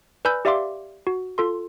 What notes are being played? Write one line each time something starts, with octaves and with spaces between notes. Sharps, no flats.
B4 D5 G#5 B5 E6 G6
G4 D5 E5 F5 C6 D6
F#4
F4 A4 C6